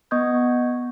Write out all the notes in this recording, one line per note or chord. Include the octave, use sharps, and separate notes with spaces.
B3 D#5 C#6 D#6 G6 G#6